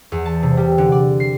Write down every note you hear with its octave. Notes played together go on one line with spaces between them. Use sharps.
E2
A5
C3
G3
D3
D5
C7